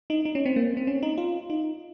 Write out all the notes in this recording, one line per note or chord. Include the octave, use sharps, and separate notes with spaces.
D#4
D#4
C#4
C4
A#3
C4
C#4
D#4
F4
D#4